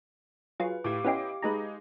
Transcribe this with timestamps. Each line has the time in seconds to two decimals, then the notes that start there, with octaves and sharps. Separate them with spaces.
0.60 F#3 F4 G#4 B4
0.84 A2 G4 F5 D6
1.04 B3 C#4 E4 D#5 G5 C6
1.42 G#3 D#4 G#4 B4 A#5